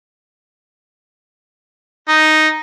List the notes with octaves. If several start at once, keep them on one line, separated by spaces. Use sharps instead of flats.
D#4